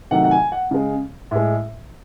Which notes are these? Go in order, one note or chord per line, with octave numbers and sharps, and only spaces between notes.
C3 D#3 F#3 A3 F#5
F#5
G#5
F#5
C#3 G#3
A2 G#3